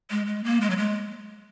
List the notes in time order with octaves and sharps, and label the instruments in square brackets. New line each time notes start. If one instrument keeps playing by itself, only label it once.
[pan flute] G#3
G#3
A#3
G#3
F#3
G#3